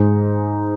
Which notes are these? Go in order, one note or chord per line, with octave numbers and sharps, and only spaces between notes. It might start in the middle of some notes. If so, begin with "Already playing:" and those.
Already playing: G#2 G#3 D#4